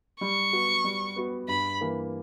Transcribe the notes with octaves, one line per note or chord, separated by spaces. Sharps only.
G3 C#6
B3 F#4
G3
B3 F#4
G2 B5
E3 A#3